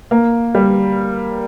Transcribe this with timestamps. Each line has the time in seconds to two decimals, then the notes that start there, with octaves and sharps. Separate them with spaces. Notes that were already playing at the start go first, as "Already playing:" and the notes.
0.11 A#3
0.55 G3